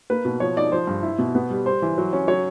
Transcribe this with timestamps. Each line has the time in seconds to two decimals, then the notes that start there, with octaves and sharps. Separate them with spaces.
0.10 A#3 B4
0.25 B2
0.40 F3 C#5
0.57 D#4 D5
0.72 F3 C5
0.87 G2
1.03 E4
1.19 B2
1.35 B3
1.50 G3
1.66 G3 C5
1.82 E3
1.98 F#3
2.13 C#4
2.28 F#3 C#5